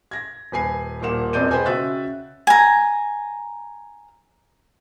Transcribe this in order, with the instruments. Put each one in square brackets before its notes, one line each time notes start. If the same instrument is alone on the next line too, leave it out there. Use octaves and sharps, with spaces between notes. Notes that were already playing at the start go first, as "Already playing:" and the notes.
[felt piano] G#6 A#6
D#1 B4 G#5 C7
D#1 A#2 A#3 F#5 E7
E1 F2 D5 D#5 G6 D#7
G#4 B4 C5 D#5 G5 G#5
C#3 F#4 E5 F#6 A6
[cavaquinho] G#5 A#5